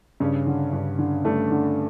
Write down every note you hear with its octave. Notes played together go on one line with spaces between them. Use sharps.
G2 C#3 C#4
D3
G2
D3
G2 A3
D3